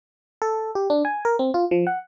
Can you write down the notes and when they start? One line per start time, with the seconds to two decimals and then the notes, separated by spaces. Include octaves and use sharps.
0.42 A4
0.75 G4
0.90 D4
1.05 G#5
1.25 A#4
1.39 C4
1.54 F4
1.71 F3
1.87 F#5